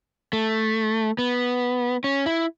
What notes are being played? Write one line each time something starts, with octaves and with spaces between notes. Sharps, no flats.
A3
B3
C#4
E4